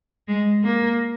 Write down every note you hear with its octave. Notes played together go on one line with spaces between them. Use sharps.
G#3
A#3